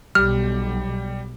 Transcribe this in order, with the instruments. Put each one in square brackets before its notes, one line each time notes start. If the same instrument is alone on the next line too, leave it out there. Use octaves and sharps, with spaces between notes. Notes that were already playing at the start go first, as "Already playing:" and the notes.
[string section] B1 [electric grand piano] G3 G4 [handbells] F6